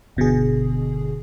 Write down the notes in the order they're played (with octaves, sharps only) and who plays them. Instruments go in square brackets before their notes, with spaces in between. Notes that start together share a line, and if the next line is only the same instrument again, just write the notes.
[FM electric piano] G1 B2 D3 G#4